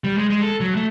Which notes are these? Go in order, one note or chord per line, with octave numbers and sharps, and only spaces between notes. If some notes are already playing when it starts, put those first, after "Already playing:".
G3
G#3
G#3
A4
F#3
A3